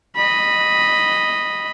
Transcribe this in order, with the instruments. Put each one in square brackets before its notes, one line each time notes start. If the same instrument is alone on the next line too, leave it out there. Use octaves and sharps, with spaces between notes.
[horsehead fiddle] D#5 B5